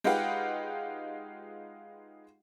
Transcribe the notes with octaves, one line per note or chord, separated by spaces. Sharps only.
G#3 D#4 F4 G4 B4 F#5